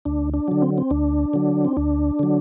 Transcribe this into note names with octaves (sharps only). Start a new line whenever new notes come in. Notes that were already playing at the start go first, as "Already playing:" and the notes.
D2 D4
D4
D3 F#3
C4
C4
D2 D4
D3 F#3
C4
D2 D4
D3 F#3